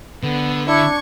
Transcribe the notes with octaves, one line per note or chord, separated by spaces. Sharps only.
D3 B3
D4 E4 C#6 G#6